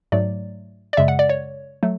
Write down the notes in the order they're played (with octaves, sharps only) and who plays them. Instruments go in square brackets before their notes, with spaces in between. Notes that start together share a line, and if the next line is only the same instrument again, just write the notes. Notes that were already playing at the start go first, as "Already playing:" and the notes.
[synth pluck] G#2 F#3 A3 D5
D5
F#2 C#3 G#3 E5
F#5
D5
C#5
F#3 A3